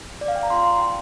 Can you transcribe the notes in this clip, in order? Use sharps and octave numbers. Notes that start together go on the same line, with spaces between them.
D5
F5
G5
A#5
C4 F4 C6
G5